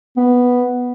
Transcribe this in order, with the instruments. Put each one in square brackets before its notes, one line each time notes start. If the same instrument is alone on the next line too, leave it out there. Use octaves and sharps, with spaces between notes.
[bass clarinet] B3